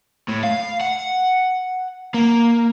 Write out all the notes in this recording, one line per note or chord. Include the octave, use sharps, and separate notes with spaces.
A2
F5
F#5
A#3